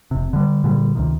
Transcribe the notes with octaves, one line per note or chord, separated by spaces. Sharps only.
F1 C3
D3 G3
A#2 D3 G3
C#2 C3 D#3